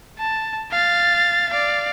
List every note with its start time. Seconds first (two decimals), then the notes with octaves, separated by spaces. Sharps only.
0.18 A5
0.71 F5 A6
1.49 D5 F5